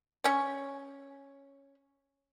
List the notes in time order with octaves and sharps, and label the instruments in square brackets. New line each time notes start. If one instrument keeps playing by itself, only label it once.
[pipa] C#4 C#5